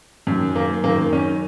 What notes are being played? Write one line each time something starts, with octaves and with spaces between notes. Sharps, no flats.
F#2 D#3
A#3
F#2 D#3 A#3
C#4